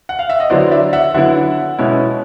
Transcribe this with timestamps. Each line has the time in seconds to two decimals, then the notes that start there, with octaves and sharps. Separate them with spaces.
0.09 F#5
0.19 F5
0.30 E5
0.40 D#5
0.50 D3 F#3 B3 E4 C5 D5
0.71 D5 E5
0.93 E5 F#5
1.14 D3 F#3 B3 E4 E5 F#5
1.79 B2 G#3 C#4 E4